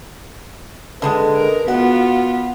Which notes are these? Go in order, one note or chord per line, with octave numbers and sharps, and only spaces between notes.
D3 G3 G#3 B4
A#4
B3 F4 F#4 F#5